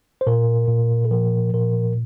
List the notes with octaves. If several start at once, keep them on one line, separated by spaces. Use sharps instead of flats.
C5
A#2 A#4
A#2
A4
F3 A#4
A#2 A#4